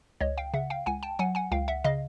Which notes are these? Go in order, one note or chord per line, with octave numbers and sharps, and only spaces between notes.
C#2 C#5 D#5
F5 G5
C#3 E5 F#5
F5 G5
C#2 F#5 G#5
G5 A5
F#3 F#5 G#5
F#5 G#5
C#2 F5 G5
E5 F#5
C#3 D#5 F5